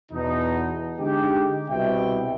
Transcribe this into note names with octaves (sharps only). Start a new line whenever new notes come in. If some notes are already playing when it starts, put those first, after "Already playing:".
E2 B2 D#4
D3 G#3 D#4 G4
C2 B2 C4 E5 G5